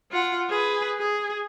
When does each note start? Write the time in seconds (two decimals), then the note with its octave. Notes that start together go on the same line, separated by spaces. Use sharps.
0.12 F4 F#5
0.50 G#4 B4
0.98 G#4